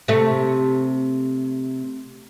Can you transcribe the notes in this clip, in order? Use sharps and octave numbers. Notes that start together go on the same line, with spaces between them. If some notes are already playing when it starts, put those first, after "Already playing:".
C3 A3